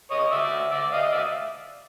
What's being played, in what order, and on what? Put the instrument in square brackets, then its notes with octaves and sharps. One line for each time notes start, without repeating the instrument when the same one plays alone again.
[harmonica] C#5 D#5
D5 E5
D5 E5
D#5 F5
D#5
D5 E5